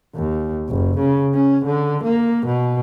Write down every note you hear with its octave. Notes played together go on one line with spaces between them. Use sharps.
D#2
F#1
C#3
C#4
D3
A#3
B2